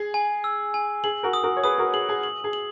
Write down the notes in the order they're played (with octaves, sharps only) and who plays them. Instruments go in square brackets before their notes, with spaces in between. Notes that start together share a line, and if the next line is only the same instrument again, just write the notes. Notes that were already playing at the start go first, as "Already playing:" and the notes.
Already playing: [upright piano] G#4
[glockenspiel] G#5
E6
G#5
[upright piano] G#4 [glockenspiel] F#7
[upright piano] F#4 A#4
[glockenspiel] D#6
[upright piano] F#4 A#4
C#5
[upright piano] G#4 B4 [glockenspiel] D#6
[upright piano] F#4 A#4
[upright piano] G#4 [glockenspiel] F#7
[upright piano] G#4
[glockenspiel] F#7
[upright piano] G#4
[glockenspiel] F#7